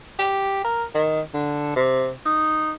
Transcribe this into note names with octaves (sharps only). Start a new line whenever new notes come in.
G4
A#4
D#3
D3
C3
D#4